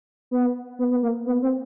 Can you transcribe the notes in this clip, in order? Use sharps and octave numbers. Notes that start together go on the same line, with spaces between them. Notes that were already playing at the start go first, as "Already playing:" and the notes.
B3
B3
B3
A#3
B3
C4